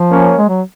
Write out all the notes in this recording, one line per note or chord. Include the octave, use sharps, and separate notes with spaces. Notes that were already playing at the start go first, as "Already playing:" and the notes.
Already playing: F3
A#3 C#4
G#3
F#3